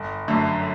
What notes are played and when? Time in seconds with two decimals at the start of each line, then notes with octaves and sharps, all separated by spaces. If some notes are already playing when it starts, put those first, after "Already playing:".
Already playing: G1
0.28 F#2 D3 A3